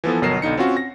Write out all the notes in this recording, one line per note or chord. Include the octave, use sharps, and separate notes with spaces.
E3 F3 B3 A4
G1 B2 F#3 A#4 C7 E7
B1 D3 D#4 C#7
C4 C#4 F4 F#4
A#6